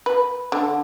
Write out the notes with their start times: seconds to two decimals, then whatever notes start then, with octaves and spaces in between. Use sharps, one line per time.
0.06 B4
0.52 D3